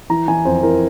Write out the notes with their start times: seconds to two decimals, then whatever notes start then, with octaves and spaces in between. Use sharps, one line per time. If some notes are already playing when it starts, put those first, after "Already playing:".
0.10 E3 A#5
0.28 E3 G#5
0.45 F2 C5
0.63 E3 A#4